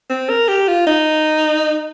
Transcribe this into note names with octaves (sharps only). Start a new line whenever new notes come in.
C4
A#4
G4
F4
D#4